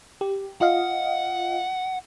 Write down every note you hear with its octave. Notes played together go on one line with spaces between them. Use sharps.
G4
F4 D#5 F5 F#5